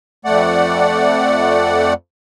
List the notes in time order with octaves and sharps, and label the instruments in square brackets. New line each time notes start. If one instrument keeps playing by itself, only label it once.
[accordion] F2 A3 D5 F#5